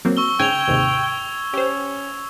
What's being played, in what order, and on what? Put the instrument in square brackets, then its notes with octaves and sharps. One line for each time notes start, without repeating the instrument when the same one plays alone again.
[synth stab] F#3 A#3 C4
[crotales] C#6 E6 G7
[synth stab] G#2 C#3 G#5 [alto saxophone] G5 [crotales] G#6 F7
[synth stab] D#2 G#2 C3
[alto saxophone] C#4 [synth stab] G4 C5